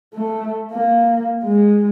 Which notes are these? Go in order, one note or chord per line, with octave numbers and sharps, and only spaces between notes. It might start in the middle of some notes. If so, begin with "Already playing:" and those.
A3
A#3
G#3